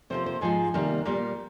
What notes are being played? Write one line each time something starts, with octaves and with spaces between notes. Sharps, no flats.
C3 F3 A#3 C5
C5
G#2 F3 G#3 G#5
C3 D#3 G3 A#3
A#2 G3 A#3